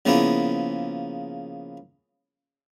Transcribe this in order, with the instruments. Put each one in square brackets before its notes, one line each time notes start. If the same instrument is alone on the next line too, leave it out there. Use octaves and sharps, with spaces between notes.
[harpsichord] C#3 F3 A#3 B3 E4 G#4